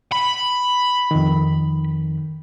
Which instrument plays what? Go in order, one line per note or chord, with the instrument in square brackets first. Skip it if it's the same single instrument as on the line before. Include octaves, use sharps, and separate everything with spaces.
[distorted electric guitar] B5
[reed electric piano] F2 D#3